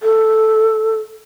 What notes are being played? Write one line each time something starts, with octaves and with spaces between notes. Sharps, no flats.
A4